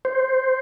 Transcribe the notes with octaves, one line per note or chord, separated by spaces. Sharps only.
C5